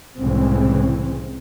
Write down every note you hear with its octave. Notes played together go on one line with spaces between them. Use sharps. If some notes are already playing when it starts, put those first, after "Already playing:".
C2 A2 C#3 E3 G#3 C4